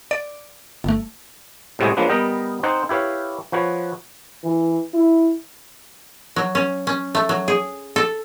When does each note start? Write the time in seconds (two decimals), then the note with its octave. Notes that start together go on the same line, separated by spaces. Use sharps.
0.11 D5
0.84 G1 A3
1.79 A2 C3 G3 G#3 F#4 G#4
1.97 F3 F#3 G#3 A#3 D4 B4
2.09 G3 B3 A#4 D#5 G5
2.63 C4 D#4 C5 F#5
2.89 E4 G4 B4 C#5 F5
3.52 F3 F#4 B4 C#5
4.44 E3
4.94 E4
6.36 F#3
6.55 C#4
6.87 C#4
7.15 A3
7.29 F#3
7.48 G#4
7.96 A4